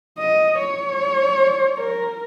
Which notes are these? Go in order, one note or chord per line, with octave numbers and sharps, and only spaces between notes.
D#5
C#5
A#4